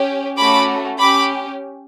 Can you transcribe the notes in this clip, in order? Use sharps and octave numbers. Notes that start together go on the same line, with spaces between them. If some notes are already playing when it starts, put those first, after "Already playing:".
Already playing: C#4 G4
A3 C#4 F#4 B5 D6
C#4 G4 B5 D6